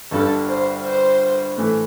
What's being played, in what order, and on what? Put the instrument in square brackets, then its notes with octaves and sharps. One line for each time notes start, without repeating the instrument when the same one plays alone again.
[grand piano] G1 G2 D3 G3 [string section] A4
[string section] C5
C5
[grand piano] A2 E3 A3